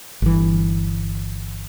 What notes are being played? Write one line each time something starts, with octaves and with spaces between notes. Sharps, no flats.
G1 E3